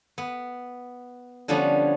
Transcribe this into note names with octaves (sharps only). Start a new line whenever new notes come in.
B3
D3 F3 G3 B3 C#4